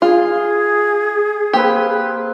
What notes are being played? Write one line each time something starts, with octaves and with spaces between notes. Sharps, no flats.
F4 G#4
A#3 C4 G4 B4